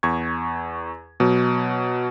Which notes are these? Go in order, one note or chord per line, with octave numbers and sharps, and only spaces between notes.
E2 C#6 G#6
B2 F#3